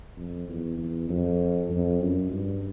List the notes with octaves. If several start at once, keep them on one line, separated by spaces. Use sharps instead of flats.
F2
E2
E2
F2
F2
F#2
G2